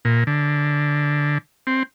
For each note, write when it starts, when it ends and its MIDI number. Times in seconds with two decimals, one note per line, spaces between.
0.05 0.24 46
0.27 1.38 50
1.67 1.83 60